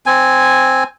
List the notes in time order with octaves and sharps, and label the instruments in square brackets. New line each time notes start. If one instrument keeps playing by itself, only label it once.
[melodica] C4 G#5